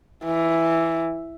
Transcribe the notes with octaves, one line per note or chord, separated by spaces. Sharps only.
E3